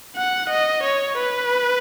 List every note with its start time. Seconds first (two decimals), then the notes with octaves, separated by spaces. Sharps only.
0.16 F#5
0.50 D#5
0.84 C#5
1.18 B4